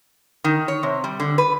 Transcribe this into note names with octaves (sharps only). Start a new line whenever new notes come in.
D#3
C#5
C3
G3
D3
B4